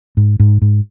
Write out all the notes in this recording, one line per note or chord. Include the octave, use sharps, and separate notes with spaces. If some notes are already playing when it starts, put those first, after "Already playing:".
G#2
G#2
G#2